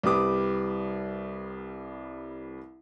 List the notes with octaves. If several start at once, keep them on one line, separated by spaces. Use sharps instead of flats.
C2 G3 B4 D6 D#6